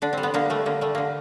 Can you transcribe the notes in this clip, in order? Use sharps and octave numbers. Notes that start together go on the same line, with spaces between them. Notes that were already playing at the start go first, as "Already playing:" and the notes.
D3 D4
G3 C4
B3
D3 A#3
G3 A3
D3 A#3
G3 A3
D3 A#3